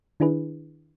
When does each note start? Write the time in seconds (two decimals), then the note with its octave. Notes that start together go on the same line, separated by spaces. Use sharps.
0.20 D#3 D4 E4 G#4 B4